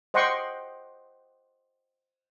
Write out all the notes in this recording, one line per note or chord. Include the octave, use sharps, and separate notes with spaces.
C5 D#5 F#5 G5 C6 C#6